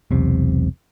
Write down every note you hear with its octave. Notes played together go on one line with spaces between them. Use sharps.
E1 B1 C3